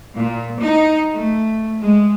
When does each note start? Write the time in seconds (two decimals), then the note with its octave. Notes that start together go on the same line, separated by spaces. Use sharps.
0.16 A#2
0.60 D#4
1.14 A3
1.81 G#3